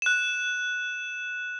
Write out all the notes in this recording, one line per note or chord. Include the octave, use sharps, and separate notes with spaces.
F#6 E7